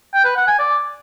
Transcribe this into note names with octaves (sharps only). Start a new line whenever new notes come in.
G5
B4
F#5
G#5
D5